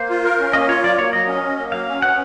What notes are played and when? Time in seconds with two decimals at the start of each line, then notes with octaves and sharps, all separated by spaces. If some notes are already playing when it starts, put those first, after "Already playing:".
Already playing: A#3 C5
0.10 F4
0.24 A#4
0.39 C#4
0.53 A#3 D#5
0.69 F4 C#5
0.84 F#3 D5
0.98 A#3 C#5
1.13 F#3 D#5
1.28 C#4
1.43 F#3
1.58 A#3
1.72 F#3 F5
1.88 C#4
2.02 B3 F#5